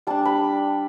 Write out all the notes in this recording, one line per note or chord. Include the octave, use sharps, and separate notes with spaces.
G3 D4 A5
B5